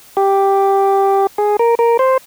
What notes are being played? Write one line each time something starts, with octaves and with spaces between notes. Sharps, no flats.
G4
G#4
A#4
A#4
C5